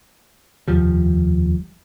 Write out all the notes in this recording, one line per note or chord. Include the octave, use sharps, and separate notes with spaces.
F1 D#2 F3 G3